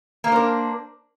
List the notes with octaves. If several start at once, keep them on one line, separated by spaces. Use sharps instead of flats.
A#3 D4 A#4 C5